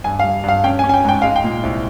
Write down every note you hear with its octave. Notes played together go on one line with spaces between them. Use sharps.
G2 G#5
F5
G3
G2 F5
C#4 G5
G#5
C#4
G#5
G5
G#2 G5
G#3 F5
G5
A#2
C2